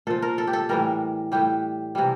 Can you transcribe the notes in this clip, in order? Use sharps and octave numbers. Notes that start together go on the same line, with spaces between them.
A#2 F3 A4
A#4
A4
G4
A4
A2 E3 G3 A#4
A2 G3 G4
C3 E3 G3